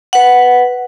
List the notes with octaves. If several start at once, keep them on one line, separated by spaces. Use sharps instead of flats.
B4 F#5